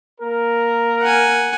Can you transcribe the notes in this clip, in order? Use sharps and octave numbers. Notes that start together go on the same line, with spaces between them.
A#3 A#4
F#5 G#5